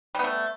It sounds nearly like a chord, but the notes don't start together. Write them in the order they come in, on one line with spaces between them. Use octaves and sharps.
G3 B3 A3